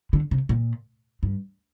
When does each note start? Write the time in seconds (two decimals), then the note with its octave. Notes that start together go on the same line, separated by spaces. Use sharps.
0.13 D3
0.31 C3
0.49 A#2
1.23 G2